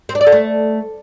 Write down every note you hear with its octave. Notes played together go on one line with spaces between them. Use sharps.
C4
D4
D5
A4
A3